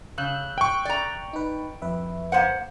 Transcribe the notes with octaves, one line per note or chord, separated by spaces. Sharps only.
C#3 E6 F#6 G6
G5 C#6
D5 A#5
D#4 B4
F2 B4 E5
A#3 C5 F#5